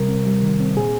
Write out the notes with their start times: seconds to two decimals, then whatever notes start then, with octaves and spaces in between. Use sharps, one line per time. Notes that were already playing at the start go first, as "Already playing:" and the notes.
Already playing: C3 G3 A#4
0.08 C4
0.26 G3
0.42 D#3
0.60 C4
0.77 A#2 G#4